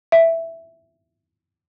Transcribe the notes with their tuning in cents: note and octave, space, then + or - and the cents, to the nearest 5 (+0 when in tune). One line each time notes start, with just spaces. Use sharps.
E5 +5